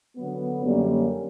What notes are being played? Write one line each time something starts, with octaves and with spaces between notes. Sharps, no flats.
D3 F#3 B3
F#2 D3 G3 A#3 C#4